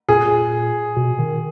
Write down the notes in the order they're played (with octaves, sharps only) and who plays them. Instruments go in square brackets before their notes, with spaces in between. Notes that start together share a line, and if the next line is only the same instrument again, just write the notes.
[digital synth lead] A#2 [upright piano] G#4
[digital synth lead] B2
D#3